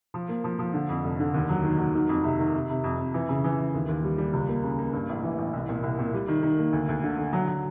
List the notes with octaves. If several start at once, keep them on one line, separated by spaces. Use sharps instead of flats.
F3
A#3
F3
F3
D3
F2
F1
D3
D#2
F#3
D#3
F#3
D#3
F2
C3
D#3
C3
C3
F2
F2
E3
C#3
E3
E3
D#2
D#2
G3
G3
C#2
A#3
C#3
A#3
G2
A1
E3
A1
C2
A#2
C2
A#2
G3
D#3
D#3
A#3
D2
D2
D3
D3
F#3
F#3